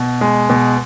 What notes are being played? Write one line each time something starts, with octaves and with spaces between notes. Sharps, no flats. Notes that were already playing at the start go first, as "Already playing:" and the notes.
Already playing: B2
G#3
B2